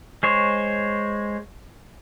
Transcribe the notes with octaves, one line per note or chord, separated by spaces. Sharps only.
G#3 C5 C#5